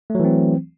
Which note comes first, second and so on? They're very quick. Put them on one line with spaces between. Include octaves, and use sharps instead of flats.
A3 F#3 E3 C4